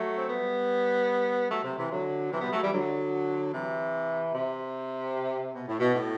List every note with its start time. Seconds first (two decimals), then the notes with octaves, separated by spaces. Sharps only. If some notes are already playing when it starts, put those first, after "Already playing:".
Already playing: F#3 A3
0.18 C4
0.29 G3 B3
1.51 F#3 A3
1.64 C3
1.78 C3 E3
1.91 D3 F#3
2.31 C3 E3
2.41 G3 B3
2.51 F#3 A3
2.62 E3 G3
2.71 D3 F#3
3.52 C3 E3
4.33 C3
5.54 B2
5.67 A2
5.80 B2
5.95 A2